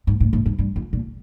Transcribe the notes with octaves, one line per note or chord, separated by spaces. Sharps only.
G#2
A2
A2
G#2
G2
F2
A#2